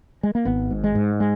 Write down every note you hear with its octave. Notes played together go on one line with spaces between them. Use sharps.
G#3
A#3
G#1 B3
G#2
G#3
G#2
G#3